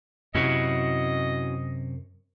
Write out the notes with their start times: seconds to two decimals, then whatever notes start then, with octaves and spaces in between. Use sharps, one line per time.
0.35 F#2 C3 C#4 E4 F#4 D#5